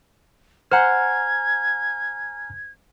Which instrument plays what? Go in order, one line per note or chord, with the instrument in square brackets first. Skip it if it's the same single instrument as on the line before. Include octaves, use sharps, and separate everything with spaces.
[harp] C5 F#5 [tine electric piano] G#5 A#5 F6 [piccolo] G#6